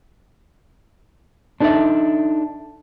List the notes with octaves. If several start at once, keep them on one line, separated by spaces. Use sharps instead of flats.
D4 D#4 A4 A#4 D5 E5